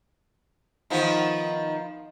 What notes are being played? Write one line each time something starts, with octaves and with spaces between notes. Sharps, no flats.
D#3 F3 B3